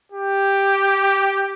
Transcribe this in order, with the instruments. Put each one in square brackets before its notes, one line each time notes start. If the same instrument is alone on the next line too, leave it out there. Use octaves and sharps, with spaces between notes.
[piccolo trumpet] G4